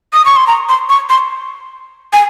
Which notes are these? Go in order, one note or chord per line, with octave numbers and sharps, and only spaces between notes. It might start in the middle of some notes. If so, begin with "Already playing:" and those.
D#6
C#6
C6
A#5
C6
C#6
C6
G#5